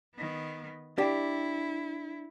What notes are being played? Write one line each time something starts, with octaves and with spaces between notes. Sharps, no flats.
D#3 B3
D4 E4 G4